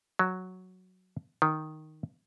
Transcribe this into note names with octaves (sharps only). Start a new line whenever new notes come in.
F#3
D#3